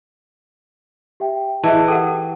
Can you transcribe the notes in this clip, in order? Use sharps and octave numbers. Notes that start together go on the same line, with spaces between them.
G4 E5 G5
E3 G#4 D#5 E5 A5
G4 A4 A#4 F#5 G5